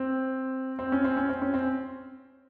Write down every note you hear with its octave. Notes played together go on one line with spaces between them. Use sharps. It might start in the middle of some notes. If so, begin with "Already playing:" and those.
Already playing: C4
C4
C#4
C4
C#4
C4
C#4
C4